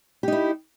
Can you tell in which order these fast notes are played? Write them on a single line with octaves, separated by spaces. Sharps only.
G4 D#4 E4